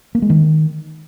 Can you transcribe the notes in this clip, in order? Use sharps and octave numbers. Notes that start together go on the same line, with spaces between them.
A#3
G#3
D#3